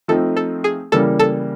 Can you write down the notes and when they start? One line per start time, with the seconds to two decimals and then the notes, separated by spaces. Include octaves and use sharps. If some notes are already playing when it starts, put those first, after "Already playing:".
0.08 F3 A3 C4 D#4 A4
0.37 A4
0.64 G#4
0.92 C#3 E3 G3 A#3 A4
1.19 A4